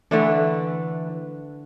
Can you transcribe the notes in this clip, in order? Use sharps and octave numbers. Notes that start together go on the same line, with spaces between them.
D3 E3 A3 D4